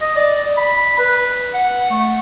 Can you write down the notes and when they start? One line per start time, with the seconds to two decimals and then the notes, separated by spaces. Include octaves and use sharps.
0.01 D#5
0.16 D5
0.57 B5
0.98 B4
1.54 F#5
1.90 A3